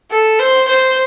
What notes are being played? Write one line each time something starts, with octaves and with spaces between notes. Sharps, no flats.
A4
C5
C5